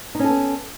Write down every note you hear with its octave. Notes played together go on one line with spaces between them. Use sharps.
B3 C#4 D#4 A4